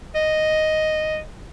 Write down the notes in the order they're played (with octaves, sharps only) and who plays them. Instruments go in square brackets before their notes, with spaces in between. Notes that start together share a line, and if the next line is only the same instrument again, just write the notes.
[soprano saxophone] D#5